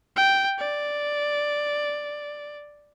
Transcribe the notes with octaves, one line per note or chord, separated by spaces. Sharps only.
G5
D5